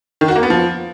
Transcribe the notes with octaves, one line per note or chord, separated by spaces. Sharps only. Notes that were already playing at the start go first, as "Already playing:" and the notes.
D#3
F#4
A#3
B3
F3